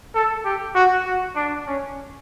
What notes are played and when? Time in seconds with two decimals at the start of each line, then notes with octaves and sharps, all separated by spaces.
0.14 A4
0.45 G4
0.75 F#4
1.06 F#4
1.36 D4
1.67 C#4